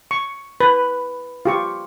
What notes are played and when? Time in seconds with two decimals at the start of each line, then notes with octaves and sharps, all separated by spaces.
0.11 C#6
0.60 B4
1.45 F4 G4 C#6